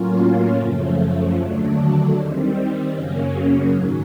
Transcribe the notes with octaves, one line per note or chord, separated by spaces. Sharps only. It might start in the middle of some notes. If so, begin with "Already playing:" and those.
Already playing: A2 F#3 A#3 C#4 F4
F#2 C#3 F3 A3
D#2 D3 F#3 A3 D4
D#3 G3 C4
F#2 C#3 F#3 A#3 C#4
G#2 D#3 F#3